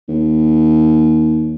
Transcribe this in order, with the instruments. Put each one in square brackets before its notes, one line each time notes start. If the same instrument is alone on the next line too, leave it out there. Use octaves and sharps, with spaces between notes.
[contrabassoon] D#2